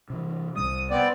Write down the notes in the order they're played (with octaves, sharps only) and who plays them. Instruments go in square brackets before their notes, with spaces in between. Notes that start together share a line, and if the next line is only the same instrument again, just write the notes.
[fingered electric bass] C3 E3
[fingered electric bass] C2 C3 G3 [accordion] D#6
[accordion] B3 C4 D5